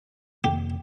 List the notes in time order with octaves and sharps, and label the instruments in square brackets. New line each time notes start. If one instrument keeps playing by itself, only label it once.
[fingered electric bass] F2 C3 A#3 [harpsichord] G4